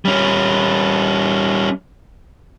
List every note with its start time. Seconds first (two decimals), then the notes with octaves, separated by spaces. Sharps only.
0.05 G3 C#4